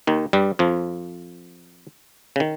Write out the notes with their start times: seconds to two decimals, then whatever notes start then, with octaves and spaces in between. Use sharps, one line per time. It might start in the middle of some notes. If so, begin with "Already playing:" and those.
0.07 D#2 D#3
0.33 G2 G3
0.59 F2 F3
2.36 C#3
2.40 D#3